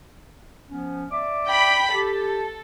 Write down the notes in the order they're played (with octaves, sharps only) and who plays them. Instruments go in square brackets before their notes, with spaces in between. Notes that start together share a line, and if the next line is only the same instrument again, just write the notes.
[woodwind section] F3 B3 C#4
D5 E5 D6
[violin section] G5 B5
[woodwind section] G4 [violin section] A4